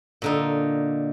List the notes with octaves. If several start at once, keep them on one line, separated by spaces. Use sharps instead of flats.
A#2 D3 D#4